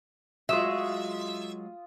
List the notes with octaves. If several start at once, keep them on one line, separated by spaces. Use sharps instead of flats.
F#3 G#3 F4 E5 D#6 E6